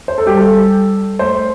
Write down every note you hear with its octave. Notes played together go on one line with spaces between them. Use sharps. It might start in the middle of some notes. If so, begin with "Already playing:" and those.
C5
A4
G3 G4
A4
A3 C5